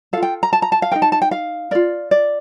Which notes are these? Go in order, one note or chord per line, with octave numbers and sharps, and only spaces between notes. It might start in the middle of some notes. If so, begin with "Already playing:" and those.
F4 A4 F5
G5
A#5
A5
A#5
A5
F5
D#4 A#4 G5
A5
A5
G5
F5
F4 A#4 D5
D5